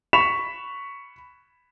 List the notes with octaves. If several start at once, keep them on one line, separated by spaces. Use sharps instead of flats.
B5 C#6 B6 E7 F7